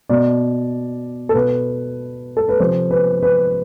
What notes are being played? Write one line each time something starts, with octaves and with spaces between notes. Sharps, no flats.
B2 D5
A4
B2 B4
A4
B4
C3 F3 C5
B4
B4